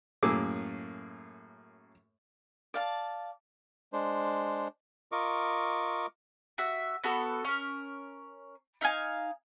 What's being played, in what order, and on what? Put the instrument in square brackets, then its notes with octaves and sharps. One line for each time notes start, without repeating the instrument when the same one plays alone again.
[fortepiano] F#2 A2 A#3 G#4 D6 E6
[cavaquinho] D5 F5 A5
[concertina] G#3 D4 C5
F4 A#4 D#5 C#6 D6
[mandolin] F#4 E5
B3 F#4 A4
C#4 A#4
D#4 E5 F5 G#5